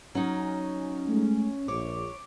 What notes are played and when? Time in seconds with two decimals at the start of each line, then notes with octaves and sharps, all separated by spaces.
0.15 F#3 C#4 D#4
1.08 G#3 A3
1.68 A#1 C#5 D6